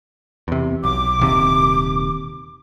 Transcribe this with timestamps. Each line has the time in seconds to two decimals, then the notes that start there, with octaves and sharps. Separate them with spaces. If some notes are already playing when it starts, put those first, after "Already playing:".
0.48 E2 C3
0.84 B1 D6
1.20 D#1 D#2 C3